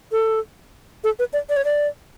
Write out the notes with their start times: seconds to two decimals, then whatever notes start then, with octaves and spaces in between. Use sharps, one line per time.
0.12 A4
1.04 A4
1.19 B4
1.33 D5
1.49 D5
1.56 C#5
1.65 D5